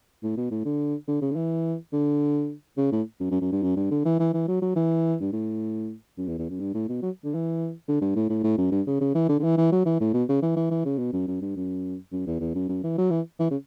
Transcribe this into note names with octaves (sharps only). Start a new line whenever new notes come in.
A2
B2
A2
D3
D3
C#3
D3
E3
D3
C#3
A2
F#2
F#2
F#2
G2
F#2
G2
D3
E3
E3
E3
F#3
F#3
E3
G2
A2
F#2
E2
E2
F#2
G2
A2
B2
F#3
D3
E3
D3
G2
A2
A2
A2
F#2
G2
C#3
C#3
E3
D3
D3
E3
E3
F#3
E3
A2
B2
C#3
E3
E3
E3
C#3
B2
F#2
F#2
G2
F#2
F#2
E2
E2
F#2
F#2
E3
F#3
E3
E3
C#3